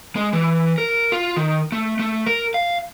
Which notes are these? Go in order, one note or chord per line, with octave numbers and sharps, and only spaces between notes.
G#3
E3
A#4
F4
D#3
A3
A3
A#4
F5